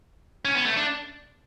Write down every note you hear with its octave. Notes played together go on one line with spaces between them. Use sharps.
C#4
B3
A3
D4